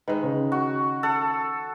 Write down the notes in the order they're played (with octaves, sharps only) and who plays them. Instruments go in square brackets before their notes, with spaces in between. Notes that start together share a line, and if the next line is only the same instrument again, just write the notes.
[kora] D#3 G#3 [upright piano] B4
[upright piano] C#3
[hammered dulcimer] F#4
[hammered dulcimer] A4 [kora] F#5